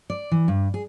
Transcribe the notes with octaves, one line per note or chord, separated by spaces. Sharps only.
D5
E3
G2
G#4